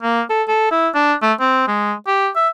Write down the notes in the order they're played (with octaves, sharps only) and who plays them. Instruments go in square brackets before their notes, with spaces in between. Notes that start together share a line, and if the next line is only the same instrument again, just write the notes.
[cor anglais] A#3
A4
A4
E4
D4
A3
C4
G#3
G4
E5